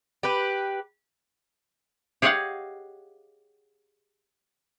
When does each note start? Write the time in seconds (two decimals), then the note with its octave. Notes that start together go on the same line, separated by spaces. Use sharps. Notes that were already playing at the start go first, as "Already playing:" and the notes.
0.23 G4 B4
2.22 G4 G#4 C#5 D#5 F5 F#5